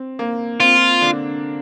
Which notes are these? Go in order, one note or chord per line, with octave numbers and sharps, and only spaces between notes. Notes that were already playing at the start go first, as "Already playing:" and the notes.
Already playing: C4
A#3
C4 F4
D3 D4